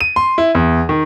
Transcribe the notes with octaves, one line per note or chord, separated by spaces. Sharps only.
D#7
C6
E4
E2
D#3